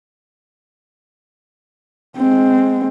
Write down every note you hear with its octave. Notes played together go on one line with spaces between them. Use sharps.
G#3 C4